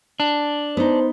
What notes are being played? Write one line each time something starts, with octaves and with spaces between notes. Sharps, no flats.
D4
B3 D#4 C5